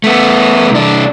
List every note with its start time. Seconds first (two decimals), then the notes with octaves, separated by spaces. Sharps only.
0.04 A3 B3
0.71 C2 D4